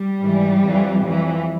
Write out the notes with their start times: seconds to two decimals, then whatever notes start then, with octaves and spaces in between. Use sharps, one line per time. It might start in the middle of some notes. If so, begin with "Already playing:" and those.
Already playing: G3
0.20 G#2 E3
0.62 F2 E3
1.03 F2 E3